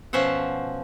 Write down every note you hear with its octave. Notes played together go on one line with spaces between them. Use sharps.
B2 F3 C#4 C5 E5 F#5